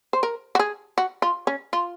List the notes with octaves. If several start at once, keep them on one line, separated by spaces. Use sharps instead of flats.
C5
A#4
F#4
G#4
F#4
F4
C#4
F4